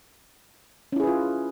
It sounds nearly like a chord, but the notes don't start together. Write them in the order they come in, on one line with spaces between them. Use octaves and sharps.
C#4 E4 G#4 B4 F4